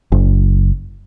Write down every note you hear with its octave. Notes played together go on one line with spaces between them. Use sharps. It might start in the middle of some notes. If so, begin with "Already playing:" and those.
F#1